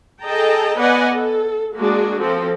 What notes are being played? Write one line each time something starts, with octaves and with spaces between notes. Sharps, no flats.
G#4 A4 D#5 G5 A5 A#5
B3 B4 D5 D#5 F#5 G#5
A4
G#3 A#3 D4 F#4 G#4
F3 C4 A4